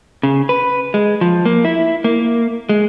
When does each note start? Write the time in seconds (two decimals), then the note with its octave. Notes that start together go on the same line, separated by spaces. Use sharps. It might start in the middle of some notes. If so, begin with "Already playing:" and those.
0.23 C#3
0.49 B4
0.94 G#3
1.21 F3
1.45 A#3
1.65 E4
2.04 A#3
2.69 G#3